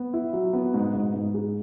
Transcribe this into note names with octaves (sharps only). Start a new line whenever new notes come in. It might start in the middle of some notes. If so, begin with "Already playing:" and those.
Already playing: B3
E4
F#3
B3
G#2
G#2
G#2
G#4